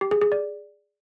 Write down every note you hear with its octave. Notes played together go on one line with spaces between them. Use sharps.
G4
G#4
G#4
D5